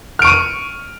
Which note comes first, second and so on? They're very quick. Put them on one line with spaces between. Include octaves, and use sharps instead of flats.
F6 D7 C#6 D#7